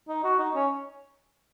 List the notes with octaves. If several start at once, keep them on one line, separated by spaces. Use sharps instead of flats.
D#4
F#4
D#4
C#4